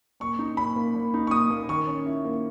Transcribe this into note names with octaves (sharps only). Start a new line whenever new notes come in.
A#2 C#6
D#4
A#2 B5
A#3
A#2
D#4
C#6
A#2 D#6
A#3
D#3 C#6
C#4
E4
A#3